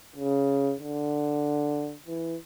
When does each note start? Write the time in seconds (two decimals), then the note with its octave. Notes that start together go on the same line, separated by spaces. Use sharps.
0.16 C#3
0.80 D3
2.07 E3